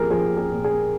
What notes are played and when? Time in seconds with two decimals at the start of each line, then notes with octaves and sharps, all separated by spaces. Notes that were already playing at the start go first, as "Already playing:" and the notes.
Already playing: A#2 F3 G4 G#4 A#4
0.10 F3 G#4
0.37 G#4
0.51 A#2
0.64 G#4